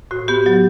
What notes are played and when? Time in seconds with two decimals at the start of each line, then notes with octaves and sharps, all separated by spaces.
0.11 A2 F#4
0.28 B3 G4
0.46 F#3 G4